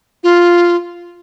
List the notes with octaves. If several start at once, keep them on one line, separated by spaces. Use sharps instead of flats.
F4